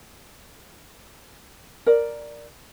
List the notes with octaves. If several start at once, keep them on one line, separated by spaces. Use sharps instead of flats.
A#4 D5